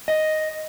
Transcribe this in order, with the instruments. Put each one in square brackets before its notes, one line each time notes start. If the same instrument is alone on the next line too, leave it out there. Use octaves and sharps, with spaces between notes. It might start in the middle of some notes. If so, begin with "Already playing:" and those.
[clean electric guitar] D#5